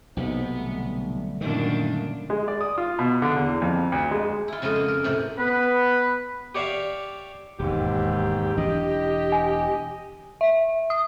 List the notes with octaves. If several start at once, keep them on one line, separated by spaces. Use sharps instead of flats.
B1 C3 A#3 B3 D#4 C5
D3 G3 A3
F#2 A#2 D#3 D4
G#3
D5
D#6
F4
B2
D3
E2
F2
D2
G#3
E4 F4
F2 C#3 G#3 F4 F#4 D#5
A#3
A#4
A2 C3 D5
B3 B4
G4 C#5 D5 E5 F5
E1 D#2 G#2 G4
E1 E3 D4 D#5
G#5
E5
D#6